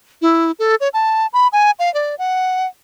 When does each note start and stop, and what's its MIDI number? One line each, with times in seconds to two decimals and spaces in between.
0.22 0.51 64
0.59 0.75 69
0.81 0.89 73
0.94 1.27 81
1.33 1.47 83
1.53 1.71 80
1.79 1.92 77
1.94 2.15 74
2.19 2.67 78